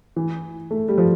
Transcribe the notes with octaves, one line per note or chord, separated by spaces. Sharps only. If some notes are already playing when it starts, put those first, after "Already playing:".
E3
A3
G3
F3